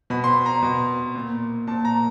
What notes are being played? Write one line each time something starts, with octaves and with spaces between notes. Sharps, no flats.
B2 B5
C6
B5
A#5
B2
A#2
A#2 A5
A#5